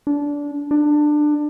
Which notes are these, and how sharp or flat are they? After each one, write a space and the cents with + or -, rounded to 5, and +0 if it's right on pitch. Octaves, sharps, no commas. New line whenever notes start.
D4 -20
D4 +20